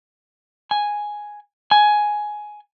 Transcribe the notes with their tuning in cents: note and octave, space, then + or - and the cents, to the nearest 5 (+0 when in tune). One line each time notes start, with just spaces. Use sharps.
G#5 +0
G#5 +10